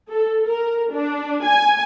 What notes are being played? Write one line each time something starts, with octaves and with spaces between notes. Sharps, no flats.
A4
A#4
D4
G#5